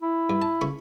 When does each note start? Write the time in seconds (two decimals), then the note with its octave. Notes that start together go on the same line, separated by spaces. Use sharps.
0.02 E4
0.30 G2
0.42 A5
0.61 C#2 B5 C#6